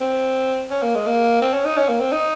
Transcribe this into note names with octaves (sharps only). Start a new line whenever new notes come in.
C4
C#4
A#3
G#3
A#3
C4
C#4
D#4
C#4
A#3
C4
D#4